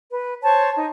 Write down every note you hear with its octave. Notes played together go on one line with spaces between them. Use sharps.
B4
C5 C#5 A5 C#6
D#4